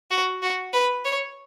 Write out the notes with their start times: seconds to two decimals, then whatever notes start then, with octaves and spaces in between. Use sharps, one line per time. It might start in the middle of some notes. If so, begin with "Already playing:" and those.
0.11 F#4
0.42 F#4
0.73 B4
1.05 C#5